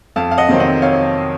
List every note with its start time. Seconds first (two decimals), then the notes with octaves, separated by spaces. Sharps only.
0.16 F2 F5 A5
0.31 F5
0.38 D#5 F#5
0.49 C3 D#3 F#3 C4
0.60 D#5 F#5
0.82 C#5 F5